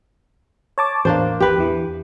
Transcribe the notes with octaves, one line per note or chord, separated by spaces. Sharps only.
C#5 A5 D6
A1 E2 A#3 D4 C5
G4 B4
E2 E3